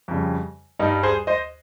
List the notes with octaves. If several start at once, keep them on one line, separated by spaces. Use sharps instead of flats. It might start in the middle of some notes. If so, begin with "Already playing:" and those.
F2 C#3 G3
G2 G3 D#4
G#4 C5
C5 D#5